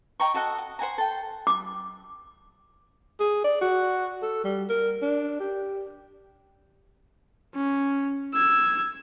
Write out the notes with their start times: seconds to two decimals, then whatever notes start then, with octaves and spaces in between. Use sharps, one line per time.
0.20 D#5 G5 A#5 C#6
0.34 F#4 A4 D#5 F#5
0.58 F#5
0.79 C5 F#5 G#5 A#5
0.98 A4 G5
1.47 D6
3.20 G#4
3.44 D5
3.61 F#4
4.22 A4
4.44 G3
4.70 A#4
5.02 D4
5.40 G4
7.54 C#4
8.34 E6 G#6